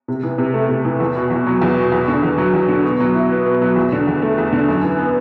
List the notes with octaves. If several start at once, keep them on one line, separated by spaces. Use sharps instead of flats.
C3
E3
C3
A3
C3
E3
E2
B2
E2
F#3
E2
B2
E2
D3
E2
F#3
E2
D3
B2
F#3
E4
B3
B2
F#3
E2
D3
E2
A3
E2
D3
F#2
E3
B3